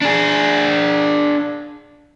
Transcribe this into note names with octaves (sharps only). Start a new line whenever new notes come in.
D4 G#4